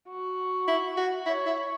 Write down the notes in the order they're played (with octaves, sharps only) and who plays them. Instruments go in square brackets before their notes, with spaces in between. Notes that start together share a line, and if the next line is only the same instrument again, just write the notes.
[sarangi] F#4
[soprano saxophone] E4
F#4
[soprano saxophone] E4 [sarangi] C#5
[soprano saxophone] E4